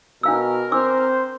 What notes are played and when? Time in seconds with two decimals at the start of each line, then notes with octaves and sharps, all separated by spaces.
0.23 B2 D4 A#4 F5 E6
0.72 C4 D4 C5 D6 E6